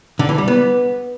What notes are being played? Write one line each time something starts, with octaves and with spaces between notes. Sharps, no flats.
D3
E3
G3
B3